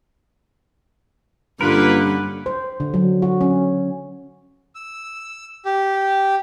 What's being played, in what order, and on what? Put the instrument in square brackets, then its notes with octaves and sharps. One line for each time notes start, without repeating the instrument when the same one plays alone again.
[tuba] G2 [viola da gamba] D3 C#4 [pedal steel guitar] A#3 A#4 [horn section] F4 B4
[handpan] C5
D3
F#3
F#4
C#4
[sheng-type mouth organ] E6
G4